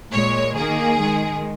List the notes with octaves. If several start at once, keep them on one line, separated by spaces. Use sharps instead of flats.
A#2 G#3 C#5
D#3 A#3 G#4
D#3 G#3